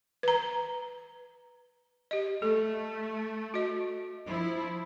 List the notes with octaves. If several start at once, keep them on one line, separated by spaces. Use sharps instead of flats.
B4 A#5
G4 D#5
A3 A4
F#4 D#5
F3 E4